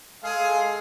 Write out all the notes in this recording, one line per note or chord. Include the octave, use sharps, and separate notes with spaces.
G#3 G#4 A4 F5 G#5